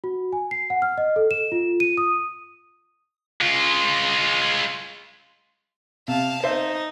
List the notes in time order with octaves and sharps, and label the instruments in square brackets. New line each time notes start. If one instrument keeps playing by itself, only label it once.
[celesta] F#4
G#5
C7
F#5
F6
D#5
A4
E7
F4
D#7
D#6
[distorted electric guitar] G#3 F4
[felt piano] C3 [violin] F5 A5
[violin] D#4 [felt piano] C5 E5